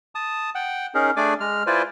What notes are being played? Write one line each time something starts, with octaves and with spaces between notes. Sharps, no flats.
A5 D#6
F#5 G5
C#4 D#4 G#4 A#4
A3 D4 G#4 D5 G#5 D6
G#3 F6
E4 F4 B4 C5 D5 G#5